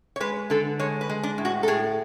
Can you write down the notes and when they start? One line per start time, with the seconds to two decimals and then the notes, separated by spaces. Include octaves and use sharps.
0.16 C#5
0.20 G#3 B4
0.50 D3 A4
0.79 G#3 C#5
1.01 B4
1.09 G#3
1.23 D4
1.38 A2
1.45 F#4
1.63 A4
1.68 A2 G#4